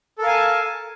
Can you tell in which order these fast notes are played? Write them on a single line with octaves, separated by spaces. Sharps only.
A4 A#4 F5 G#5 A5